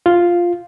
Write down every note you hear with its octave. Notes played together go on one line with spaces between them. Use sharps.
F4